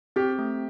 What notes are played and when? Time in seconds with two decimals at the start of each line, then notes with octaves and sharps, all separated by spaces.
0.16 C4 G4
0.39 A3